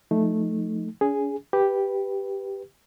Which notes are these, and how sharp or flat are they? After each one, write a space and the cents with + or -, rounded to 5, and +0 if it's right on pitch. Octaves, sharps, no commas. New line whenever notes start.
F3 +20 A3 +0 D#4 +0
C#4 +40 G#4 -5
G4 +0 B4 +0